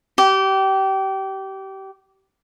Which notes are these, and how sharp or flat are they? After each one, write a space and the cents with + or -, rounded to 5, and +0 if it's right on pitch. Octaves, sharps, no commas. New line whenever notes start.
G4 -25